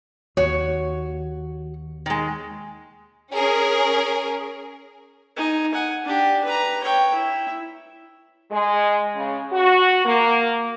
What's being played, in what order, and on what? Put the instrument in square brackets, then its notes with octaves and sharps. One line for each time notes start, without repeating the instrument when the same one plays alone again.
[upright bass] D#2 [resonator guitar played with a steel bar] F#4 C#5
[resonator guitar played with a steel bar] D#3 G#3
[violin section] C#4 G#4 A#4
[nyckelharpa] D#4 G#5
F#5 G#5
D4 G4
B4 A#5
C#5 G5
E4
[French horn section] G#3
C#3
F#4
A#3